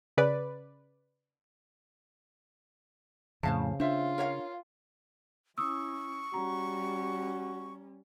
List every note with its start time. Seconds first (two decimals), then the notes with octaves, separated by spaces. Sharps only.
0.17 C#3 B4 D5
3.43 F2 A2 C#3 C5 F5 A5
3.80 D4 F4 C5 E5
4.18 A#4 C#5 F5
5.58 C#4 E4 C#6 D#6 E6
6.34 G3 C#4 F#4 A#5